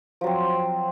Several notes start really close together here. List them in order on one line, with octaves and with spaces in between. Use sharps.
F3 F#3 C4